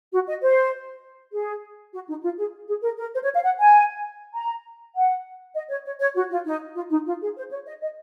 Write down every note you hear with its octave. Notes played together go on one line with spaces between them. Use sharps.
F#4
D#5
C5
G#4
F#4
D#4
F4
G#4
G#4
A#4
A#4
C5
C#5
F5
F#5
G#5
A#5
F#5
D#5
C#5
C#5
C#5
F#4
F4
D#4
F4
D#4
F4
G#4
C5
C#5
D#5
D#5